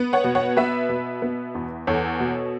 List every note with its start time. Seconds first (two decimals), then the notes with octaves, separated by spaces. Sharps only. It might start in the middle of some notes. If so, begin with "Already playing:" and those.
Already playing: B3
0.13 C#5 F#5
0.24 B2
0.35 C#5 F#5
0.57 B3 B4 E5
0.89 B2
1.22 B3
1.55 E2
1.87 E2 A4 C#5
2.20 B2